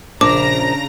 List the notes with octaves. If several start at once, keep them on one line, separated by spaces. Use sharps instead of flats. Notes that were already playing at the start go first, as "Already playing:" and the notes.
A#1 C#3 D4 A#5 D6 A#6